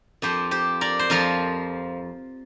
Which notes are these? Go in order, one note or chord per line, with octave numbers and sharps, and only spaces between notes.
F2 F3 G4 C5
G4 C5
A#4 D5
C5
F2 F3 F4 A#4